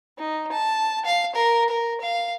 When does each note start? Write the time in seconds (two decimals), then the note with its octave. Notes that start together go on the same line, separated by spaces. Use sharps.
0.18 D#4
0.52 A5
1.05 F5
1.35 A#4
1.69 A#4
2.01 F5